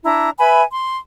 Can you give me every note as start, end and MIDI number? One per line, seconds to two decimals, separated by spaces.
0.04 0.29 62
0.04 0.29 64
0.04 0.29 82
0.38 0.61 71
0.38 0.61 76
0.38 0.61 80
0.38 0.61 83
0.72 0.95 84